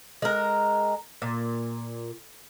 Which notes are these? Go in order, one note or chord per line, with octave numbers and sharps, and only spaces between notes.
G#3 A#4
A#2